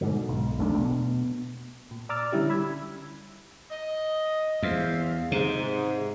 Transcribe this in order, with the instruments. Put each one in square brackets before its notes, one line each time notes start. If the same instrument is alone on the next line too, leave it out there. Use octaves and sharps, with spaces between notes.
[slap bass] G#2 B2 D3
B1
E1 B1 A3 D4
B2
[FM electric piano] A#2
D5 A#5 D6 E6 F6 A6
D3 G3 C#4 E4 G4
B5 E6 G#6
[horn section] D#5
[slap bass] E2 [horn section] C5 E5 F5
[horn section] G#2 [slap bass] C3